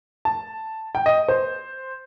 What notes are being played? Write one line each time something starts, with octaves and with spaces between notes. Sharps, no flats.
A5
G5
D#5
C5